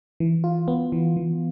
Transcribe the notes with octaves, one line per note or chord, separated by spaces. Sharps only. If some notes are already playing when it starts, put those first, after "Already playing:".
E3
F4
B3
E3
E3